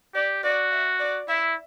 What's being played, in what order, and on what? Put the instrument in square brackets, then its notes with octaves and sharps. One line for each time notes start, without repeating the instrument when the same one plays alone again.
[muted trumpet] G4 [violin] D5
[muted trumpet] F#4 [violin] D5
[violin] E5
D5
[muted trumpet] E4 [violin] E5